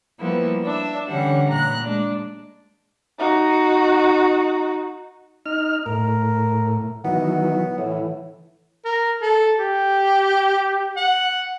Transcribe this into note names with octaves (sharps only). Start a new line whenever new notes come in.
F3 G3 A#3 B3 E4
D4 E5
D3 E3 G3 C#4 F#5
A#2 A#5 F#6
G#3 D4
D#4 F#4
D#4 F6
A2 A#4
D#3 E3 F#3 B3
A2 E3
A#4
A4
G4
F#5